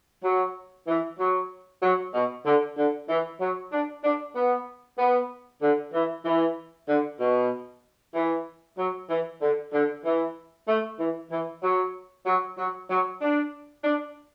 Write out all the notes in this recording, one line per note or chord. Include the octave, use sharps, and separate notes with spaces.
F#3
E3
F#3
F#3
B2
D3
D3
E3
F#3
D4
D4
B3
B3
D3
E3
E3
D3
B2
E3
F#3
E3
D3
D3
E3
A3
E3
E3
F#3
F#3
F#3
F#3
D4
D4